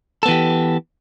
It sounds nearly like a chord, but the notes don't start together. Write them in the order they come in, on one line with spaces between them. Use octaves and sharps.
A4 B3 E3 G4